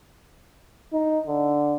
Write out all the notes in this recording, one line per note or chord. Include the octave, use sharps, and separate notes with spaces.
D#4
D3